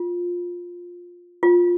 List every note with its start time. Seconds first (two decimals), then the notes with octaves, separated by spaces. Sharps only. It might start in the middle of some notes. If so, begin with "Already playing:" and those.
Already playing: F4
1.43 F4